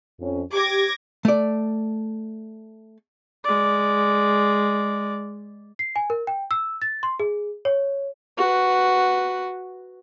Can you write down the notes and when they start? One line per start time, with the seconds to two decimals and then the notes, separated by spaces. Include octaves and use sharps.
0.20 F2 C#4
0.52 G4 D6 G#6 A#6
1.25 A3 D5
3.45 G#3 D5
5.79 C7
5.96 G#5
6.10 A#4
6.27 G5
6.51 E6
6.82 A6
7.03 C6
7.20 G#4
7.65 C#5
8.38 F#4 B4